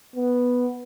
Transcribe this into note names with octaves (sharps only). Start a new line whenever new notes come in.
B3